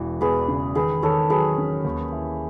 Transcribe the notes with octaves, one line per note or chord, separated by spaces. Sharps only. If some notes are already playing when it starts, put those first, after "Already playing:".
Already playing: E1 E3
E2 G#4 B4
C#3
D#3 G#4 B4
D#3 A4 C#5
F#3 G#4 B4
C#4
D#2
E4